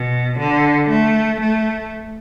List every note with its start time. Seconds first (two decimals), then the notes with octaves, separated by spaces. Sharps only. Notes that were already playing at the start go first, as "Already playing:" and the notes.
Already playing: B2
0.39 D3
0.90 A3
1.41 A3